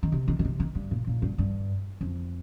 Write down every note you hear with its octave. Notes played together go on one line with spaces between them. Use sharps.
D#3
C3
D#3
D#3
C3
D#3
G2
A#2
A#2
G2
G2
F2